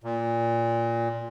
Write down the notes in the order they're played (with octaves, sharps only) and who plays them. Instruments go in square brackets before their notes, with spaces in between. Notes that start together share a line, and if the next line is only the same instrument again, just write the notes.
[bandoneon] A#2